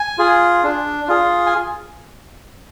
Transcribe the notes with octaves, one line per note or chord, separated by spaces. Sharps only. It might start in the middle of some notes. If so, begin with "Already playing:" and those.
Already playing: G#5
F4 G#4
D4
F4 G#4
G#5